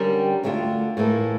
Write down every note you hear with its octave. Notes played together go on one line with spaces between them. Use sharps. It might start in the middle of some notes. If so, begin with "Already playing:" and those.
Already playing: D3 G3 C#4 G4 A#4
D2 D3 A3 D4 F4
A2 E3 A#3 E4 A4